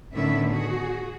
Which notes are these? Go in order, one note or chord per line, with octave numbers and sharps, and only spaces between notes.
A2 D3 D#3 B3 C#4 E5
F#4 G#4